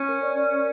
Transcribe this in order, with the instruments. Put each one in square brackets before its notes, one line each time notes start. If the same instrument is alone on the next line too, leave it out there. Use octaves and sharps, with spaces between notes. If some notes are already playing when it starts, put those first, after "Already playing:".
Already playing: [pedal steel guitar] C#4 [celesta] C#6
[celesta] A#4
D5
D5
A#4